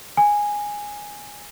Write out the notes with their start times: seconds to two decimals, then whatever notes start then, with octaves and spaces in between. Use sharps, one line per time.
0.17 G#5